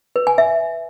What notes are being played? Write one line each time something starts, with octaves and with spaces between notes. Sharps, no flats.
B4
G#5
E5